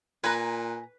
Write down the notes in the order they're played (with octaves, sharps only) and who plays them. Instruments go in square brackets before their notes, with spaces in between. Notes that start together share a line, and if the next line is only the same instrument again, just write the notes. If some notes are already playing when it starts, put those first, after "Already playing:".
[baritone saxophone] A#2 [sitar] B4 [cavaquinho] G#5 A#5